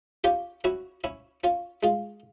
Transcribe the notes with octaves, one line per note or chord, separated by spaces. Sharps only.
C#4 F4 G4
C#4 E4 F#4
C#4 E4
C#4 F4
G#3 F4